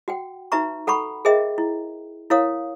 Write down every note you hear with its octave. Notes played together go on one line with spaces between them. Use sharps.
F#4 F#5 G5
D#4 F#4 B4 E5 A#5 C#6
A4 F#5 A#5 B5 C#6
G#4 A#4 C5 D#5 E5 G5
E4
E4 A#4 C#5 F5 D#6